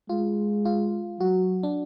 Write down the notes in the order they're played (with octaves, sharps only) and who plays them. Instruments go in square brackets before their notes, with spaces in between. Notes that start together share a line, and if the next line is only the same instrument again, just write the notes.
[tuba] G#3 [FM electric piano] F4
[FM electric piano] F4
[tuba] F#3 [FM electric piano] F#4
[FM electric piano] D4